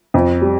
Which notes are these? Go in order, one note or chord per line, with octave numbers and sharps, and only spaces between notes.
F2
G3